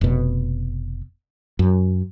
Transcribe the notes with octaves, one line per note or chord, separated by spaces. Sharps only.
F1 B2
F#2